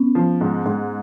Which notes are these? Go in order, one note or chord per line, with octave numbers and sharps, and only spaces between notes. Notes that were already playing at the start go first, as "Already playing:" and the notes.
Already playing: B3 C#4
F3
G#2
G#2